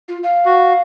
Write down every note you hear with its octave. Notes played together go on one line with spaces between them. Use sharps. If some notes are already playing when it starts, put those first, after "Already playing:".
F4
F5
F#4